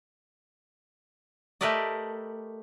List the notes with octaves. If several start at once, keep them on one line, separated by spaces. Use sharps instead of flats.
A3 G4 A#4 B4 D5 D#5